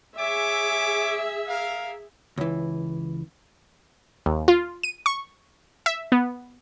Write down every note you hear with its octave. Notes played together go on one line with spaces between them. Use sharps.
G#4 C#5 E5 G#5 D6
A#4 F5
C#2 E3
D#2
F4
D#7
C#6
E5
B3